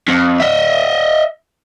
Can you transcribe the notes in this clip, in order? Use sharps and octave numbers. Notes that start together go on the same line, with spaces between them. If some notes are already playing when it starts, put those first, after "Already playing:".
F2
D#5 E5